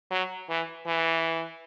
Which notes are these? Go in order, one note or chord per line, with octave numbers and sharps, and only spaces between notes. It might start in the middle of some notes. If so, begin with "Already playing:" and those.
F#3
E3
E3